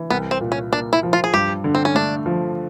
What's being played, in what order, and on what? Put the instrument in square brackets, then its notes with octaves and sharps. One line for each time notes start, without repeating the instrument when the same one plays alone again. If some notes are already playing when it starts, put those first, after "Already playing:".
Already playing: [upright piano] E3
[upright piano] C2 [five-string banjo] B3
[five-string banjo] C4
[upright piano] A#2
[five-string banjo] C#4
[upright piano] A#3 [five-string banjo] D4
[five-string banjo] E4
[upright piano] F3
[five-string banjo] F4
G#4
[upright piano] G2 [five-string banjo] G4
[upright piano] D3
[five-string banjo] C4
C#4
[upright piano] A3 [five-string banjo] D4
[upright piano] F3